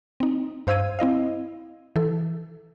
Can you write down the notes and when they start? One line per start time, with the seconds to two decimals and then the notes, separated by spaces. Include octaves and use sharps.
0.20 C4 D#4
0.67 G2 C5 F5 E6 G#6 D#7
0.99 C4 E4 D#5 F5
1.96 E3 A4